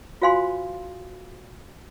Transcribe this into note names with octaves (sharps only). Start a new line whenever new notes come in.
F4 F#4 C5 F5 G#5 C6